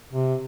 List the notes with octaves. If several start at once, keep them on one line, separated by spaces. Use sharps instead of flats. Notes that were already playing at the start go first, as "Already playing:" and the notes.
C3